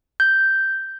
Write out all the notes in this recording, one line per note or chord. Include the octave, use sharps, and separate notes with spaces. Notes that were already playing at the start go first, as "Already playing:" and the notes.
G6